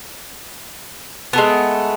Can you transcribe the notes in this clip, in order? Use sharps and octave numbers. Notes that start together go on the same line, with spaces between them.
G#3 A3 B3